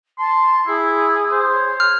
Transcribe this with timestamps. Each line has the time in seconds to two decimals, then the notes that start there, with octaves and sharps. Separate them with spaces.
0.19 A5 C6
0.67 E4 G#4
1.32 C5
1.52 C#5
1.80 F6